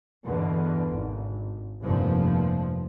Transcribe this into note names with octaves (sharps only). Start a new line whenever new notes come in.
E2 G2 B2 D3
G#1
F1 G2 A#2 F3